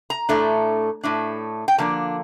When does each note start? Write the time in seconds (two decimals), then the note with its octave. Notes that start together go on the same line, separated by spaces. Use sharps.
0.10 A#5
0.29 A2 A3 D4
1.03 A2 A3 D4
1.68 G5
1.78 D3 F3 A#3 D4 A5